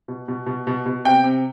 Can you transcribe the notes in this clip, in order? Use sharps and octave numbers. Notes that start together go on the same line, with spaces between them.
B2
B2
B2
B2
B2
C3 G5
C3